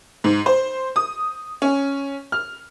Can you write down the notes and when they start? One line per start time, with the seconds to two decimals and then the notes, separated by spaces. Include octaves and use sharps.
0.24 G#2
0.46 C5
0.96 D#6
1.62 C#4
2.32 F6